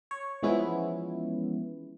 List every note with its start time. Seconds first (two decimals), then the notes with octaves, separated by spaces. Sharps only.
0.11 C#5
0.43 E3 F3 G#3 B3 C#4 E4